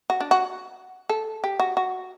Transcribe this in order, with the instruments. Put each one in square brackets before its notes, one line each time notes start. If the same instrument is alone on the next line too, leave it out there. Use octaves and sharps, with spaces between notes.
[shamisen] F#4
D4
F#4
A4
G4
F#4
F#4